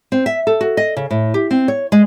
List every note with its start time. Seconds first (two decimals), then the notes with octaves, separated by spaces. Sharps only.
0.12 C4
0.26 E5
0.47 A4
0.61 F#4
0.77 D#5
0.97 C#3
1.11 A2
1.34 G4
1.51 C4
1.68 C#5
1.92 G#3